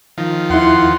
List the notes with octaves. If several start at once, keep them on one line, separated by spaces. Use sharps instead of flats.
D#3 F3
D#2 E4 F#5 C6